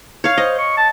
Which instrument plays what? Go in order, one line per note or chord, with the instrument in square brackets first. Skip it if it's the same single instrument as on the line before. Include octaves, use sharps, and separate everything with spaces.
[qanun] C#5 F5
[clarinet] C5 [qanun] D#5
[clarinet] C#6
A5